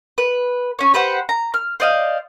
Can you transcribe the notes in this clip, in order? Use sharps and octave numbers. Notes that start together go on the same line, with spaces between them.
B4
C#4 C#5
G4 B4 C5 F#5
A#5
F6
C5 D5 D#5 F5